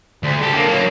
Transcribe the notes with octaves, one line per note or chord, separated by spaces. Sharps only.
D2
G4 A4
D3 A#3
F#3 A#3